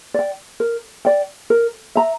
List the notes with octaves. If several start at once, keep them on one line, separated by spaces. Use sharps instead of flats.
D5 G5
A#4
D5 G5
A#4
E5 A#5